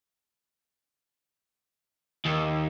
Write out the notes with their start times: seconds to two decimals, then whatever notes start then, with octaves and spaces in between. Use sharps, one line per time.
2.26 D#2